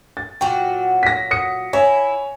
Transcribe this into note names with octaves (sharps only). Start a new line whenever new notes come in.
A6
A#2 F#3 F#4 G5
A#6 B6
D#6 A#6 C#7
E4 C#5 G#5